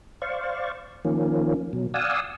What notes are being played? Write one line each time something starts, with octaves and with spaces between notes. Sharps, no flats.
C5 D5 F5 C#6
D#3 F3 A#3 C#4
B2 F#3
D5 F5 F#5 G#5 D#6 E6